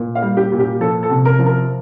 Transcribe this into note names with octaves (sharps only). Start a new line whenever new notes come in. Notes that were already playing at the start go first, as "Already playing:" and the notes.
Already playing: A#2
F5
G3
G4
A#2
G4
F3 A4
A4
C3
A#4
F3
A#4